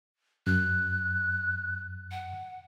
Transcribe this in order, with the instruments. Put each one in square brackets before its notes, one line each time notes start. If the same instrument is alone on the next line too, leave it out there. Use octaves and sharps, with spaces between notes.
[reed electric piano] F#2 [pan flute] F#6
[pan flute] F#5